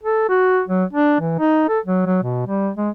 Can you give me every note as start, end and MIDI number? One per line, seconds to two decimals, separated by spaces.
0.03 0.28 69
0.29 0.62 66
0.68 0.84 54
0.93 1.20 62
1.21 1.38 52
1.39 1.65 63
1.69 1.79 69
1.85 2.01 54
2.06 2.20 54
2.23 2.46 47
2.47 2.70 55
2.77 2.90 56